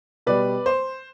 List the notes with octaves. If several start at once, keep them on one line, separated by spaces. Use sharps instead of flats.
B2 G3 B4 D5
C5